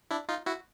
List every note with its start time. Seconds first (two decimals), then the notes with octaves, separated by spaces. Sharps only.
0.11 D4 E4
0.29 D#4 F4
0.46 E4 F#4